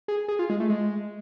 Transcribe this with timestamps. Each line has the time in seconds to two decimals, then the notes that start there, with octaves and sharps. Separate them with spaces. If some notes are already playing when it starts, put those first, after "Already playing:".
0.08 G#4
0.28 G#4
0.39 F4
0.50 G#3
0.60 A3
0.70 G#3